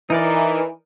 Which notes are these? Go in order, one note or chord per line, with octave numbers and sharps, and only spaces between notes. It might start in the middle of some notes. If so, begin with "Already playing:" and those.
E3 D#4 A#4 D5